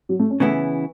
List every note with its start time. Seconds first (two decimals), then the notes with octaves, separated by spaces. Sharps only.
0.09 F#3
0.19 A3
0.30 C#4
0.40 C#3 E3 A3 B3 E4